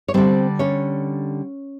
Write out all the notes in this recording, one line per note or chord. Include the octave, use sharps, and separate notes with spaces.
C#5
D3 G3 C4 C5
C#4 C#5